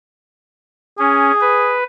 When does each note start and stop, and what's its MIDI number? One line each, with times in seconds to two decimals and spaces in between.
0.99 1.31 61
0.99 1.76 68
1.41 1.84 71